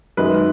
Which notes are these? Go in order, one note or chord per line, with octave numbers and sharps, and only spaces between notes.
F#2 D#3 G#3 B4